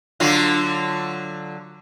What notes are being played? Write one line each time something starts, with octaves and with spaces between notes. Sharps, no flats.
D3 F#3 F4